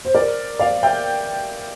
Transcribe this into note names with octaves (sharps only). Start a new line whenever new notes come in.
C5
A#4 D5
D5 F5
E5 G5